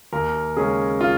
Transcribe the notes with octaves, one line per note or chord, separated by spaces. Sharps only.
D#2 A#4
C#3 G#3 C#4 G#4
F4